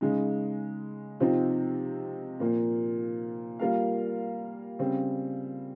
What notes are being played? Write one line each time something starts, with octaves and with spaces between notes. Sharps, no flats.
C#3 G#3 D#4
C3 F3 C4 D#4
A#2 F3 A#3
G3 A#3 F4 A#4 F5
C#3 G3 C4